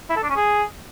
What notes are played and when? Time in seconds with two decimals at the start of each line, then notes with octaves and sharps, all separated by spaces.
0.10 E4
0.16 A4
0.23 D4
0.30 C#4
0.36 G#4